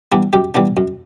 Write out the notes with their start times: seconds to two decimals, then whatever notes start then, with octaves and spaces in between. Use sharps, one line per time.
0.12 E3 G3 B3 D4
0.33 F#2 G4
0.55 E3 G3 B3 D4
0.77 F#2